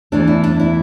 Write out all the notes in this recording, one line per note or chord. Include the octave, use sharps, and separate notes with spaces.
E2 E3 A3 D4
E4
D4
E4